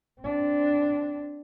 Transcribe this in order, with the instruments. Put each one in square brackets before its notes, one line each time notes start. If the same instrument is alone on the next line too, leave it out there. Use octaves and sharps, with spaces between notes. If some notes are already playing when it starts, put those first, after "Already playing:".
[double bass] C4 D4